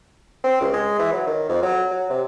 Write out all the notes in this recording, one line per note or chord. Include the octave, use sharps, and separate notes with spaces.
C4
C#2
G#3
E3
F#3
D#3
F2
F#3
F#3
C3